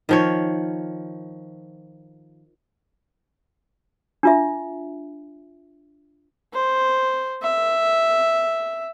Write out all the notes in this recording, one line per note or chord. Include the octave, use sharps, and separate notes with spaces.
D#3 F3 C#5
D4 F4 E5
C5
E5